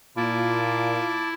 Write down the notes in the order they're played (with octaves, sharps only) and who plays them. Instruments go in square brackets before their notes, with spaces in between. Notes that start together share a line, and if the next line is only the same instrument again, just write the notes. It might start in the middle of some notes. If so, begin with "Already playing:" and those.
[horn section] A#2 [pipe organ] E4 [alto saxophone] F4 [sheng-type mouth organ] A5 D6